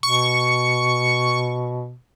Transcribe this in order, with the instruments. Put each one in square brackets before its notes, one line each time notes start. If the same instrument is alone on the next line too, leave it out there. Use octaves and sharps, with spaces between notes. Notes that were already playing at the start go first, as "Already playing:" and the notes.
[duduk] B2 [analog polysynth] C#6